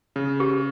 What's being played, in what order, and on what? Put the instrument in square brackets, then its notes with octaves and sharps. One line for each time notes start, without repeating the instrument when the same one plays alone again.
[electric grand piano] C#3
[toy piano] G4